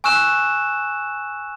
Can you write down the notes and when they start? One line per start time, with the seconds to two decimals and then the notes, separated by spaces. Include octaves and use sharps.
0.04 G#5 C#6 E6 F#6 E7